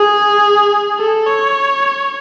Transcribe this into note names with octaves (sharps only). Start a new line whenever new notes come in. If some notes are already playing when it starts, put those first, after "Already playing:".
Already playing: G#4
A4
C#5